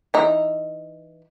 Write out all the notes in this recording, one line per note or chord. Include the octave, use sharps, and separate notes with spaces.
E3 D#4